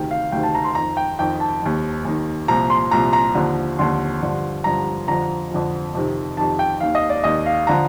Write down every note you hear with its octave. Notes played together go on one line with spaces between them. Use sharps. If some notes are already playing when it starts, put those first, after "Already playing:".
Already playing: D2 C3 D#3 G5
F5
D2 C3 D#3 G5
A5
A#5
C6
F2 D#3 A#5
G5
F2 D#3 G5
A5
D#2 D#3
D#2 D#3
C2 A#2 F3 A#5
C6
C2 A#2 F3 A#5
A#5
D#2 D3 F3
D#2 D3 F3 C6
G2 D3 F3
G2 D3 F3 A#5
F2 D3 F3 A#5
F2 D3 F3
F2 C3 D#3
F2 C3 D#3 A5
G5
D#2 D#3 F5
D#5
D5
D#2 D#3 D#5
F5
D3 F3 A#5